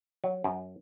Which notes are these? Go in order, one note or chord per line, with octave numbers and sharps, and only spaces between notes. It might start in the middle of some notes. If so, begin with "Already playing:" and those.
F#3
F#2